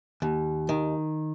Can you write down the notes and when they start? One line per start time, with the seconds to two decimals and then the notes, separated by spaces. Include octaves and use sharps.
0.22 D#2
0.69 D#3